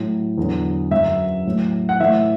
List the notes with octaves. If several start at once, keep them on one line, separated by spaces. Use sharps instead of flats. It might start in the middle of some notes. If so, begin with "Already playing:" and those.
Already playing: A2 F#3
E2 D3 F#3
F#2 F#3 E5
A2 F#3
F#5
A2 E3 E5